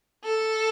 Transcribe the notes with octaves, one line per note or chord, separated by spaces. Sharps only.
A4